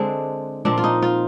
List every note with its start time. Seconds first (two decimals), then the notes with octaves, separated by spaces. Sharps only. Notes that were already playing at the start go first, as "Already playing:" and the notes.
Already playing: D3 G#3 C4 D4
0.65 A#2 F3 C4 D4
0.78 F4
0.84 D#4
1.02 F4